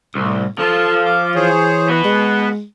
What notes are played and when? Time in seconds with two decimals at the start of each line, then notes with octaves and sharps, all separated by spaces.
0.15 C2 A2
0.59 F3 F4 A4 A5
1.05 D6
1.35 E3 G#4 C5 C#5
1.89 B3 F#4 B4
2.04 G#3